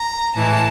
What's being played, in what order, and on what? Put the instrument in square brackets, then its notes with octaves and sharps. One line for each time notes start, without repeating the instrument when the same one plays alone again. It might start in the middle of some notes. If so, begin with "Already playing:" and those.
Already playing: [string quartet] A#5
A2 E3 G#3 A5